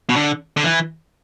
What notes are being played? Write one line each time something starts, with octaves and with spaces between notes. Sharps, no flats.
B2
D3
D3
E3